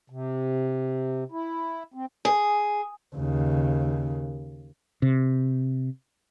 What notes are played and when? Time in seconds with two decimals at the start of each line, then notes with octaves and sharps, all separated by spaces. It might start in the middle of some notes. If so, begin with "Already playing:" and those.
0.10 C3
1.32 E4
1.94 C4
2.25 G#4
3.15 D#2 C#3
5.02 C3